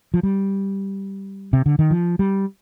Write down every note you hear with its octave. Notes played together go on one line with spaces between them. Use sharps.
F3
G3
C3
D3
D#3
F3
G3